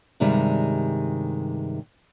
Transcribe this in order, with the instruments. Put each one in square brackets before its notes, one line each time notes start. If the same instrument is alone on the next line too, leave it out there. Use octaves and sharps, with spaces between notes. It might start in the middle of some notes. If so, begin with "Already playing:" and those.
[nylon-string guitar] G2 C3 D#3 G3 G#3